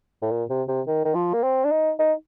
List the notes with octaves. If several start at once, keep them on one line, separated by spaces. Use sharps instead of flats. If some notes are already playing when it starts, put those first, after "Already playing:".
A2
A#2
C3
C3
D#3
D#3
F3
A#3
C4
D4
D#4
D#4